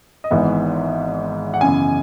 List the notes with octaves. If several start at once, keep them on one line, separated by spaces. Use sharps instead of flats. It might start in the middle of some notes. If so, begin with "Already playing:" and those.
D#5
G#1 G#2 E3 B3 E5
F#5
F#2 C#3 E3 B3 G#5